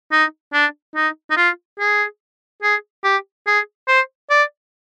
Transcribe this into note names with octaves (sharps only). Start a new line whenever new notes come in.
D#4
D4
D#4
D#4
F4
G#4
G#4
G4
G#4
C5
D5